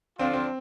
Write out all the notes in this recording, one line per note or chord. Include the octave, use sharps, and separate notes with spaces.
D3 F3 C4 D4 F4
C4